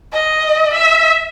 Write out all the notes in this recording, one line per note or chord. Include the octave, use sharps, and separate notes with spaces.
D#5
E5